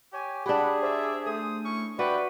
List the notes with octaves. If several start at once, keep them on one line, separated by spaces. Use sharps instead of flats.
G4 C#5 G#5
D4 G4 G#4 F#5 B5
C5 D5 E5
A3 C5 D#6
C#4 E4 C#6
F#4 G4 B4 D5 E5 G5